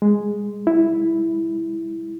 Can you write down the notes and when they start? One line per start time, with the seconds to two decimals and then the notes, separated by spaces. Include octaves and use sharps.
0.02 G#3
0.67 E4